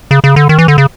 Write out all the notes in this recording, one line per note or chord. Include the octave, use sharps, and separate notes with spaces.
C#3
C#3
D3
D#3
E3
D3
C#3